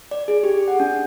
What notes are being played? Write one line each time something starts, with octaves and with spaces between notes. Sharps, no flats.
D5
G#4
G4
F#5
D4